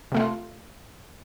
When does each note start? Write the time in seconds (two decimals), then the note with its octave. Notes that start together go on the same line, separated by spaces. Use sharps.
0.12 C3 A3 F4